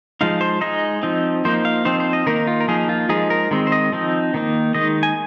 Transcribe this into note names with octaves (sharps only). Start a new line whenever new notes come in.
F3 G#3 D#4 F5
C5
G#3 D#4 D#5
F3 C4 D#4
F3 A#3 D#4 C5
F5
F3 C4 D#4 C5
C5
D#5
D#3 A#3 D#4 A#4
F4
A#4
F3 A#3 D#4 G#4
F4
F3 G#3 D#4 G#4
A#4
D#3 G#3 C4
C5
D#5
F3 C4 D#4
D#3 A#3 D#4
D#3 G#3 D#4 D#5
G#5